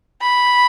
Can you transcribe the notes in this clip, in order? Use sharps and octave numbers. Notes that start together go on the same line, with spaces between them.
B5